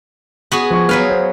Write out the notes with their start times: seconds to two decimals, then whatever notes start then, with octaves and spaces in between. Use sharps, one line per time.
0.52 B3 F#4 G#4
0.71 F3 C#6
0.89 F#3 B3 B4 F5
1.10 C5